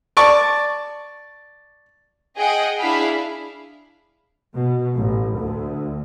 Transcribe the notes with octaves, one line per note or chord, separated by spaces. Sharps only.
D5 A5 C#6
G#4 D#5 F#5 G5
D4 E4 G#4 F5 B5
B2
A1
D2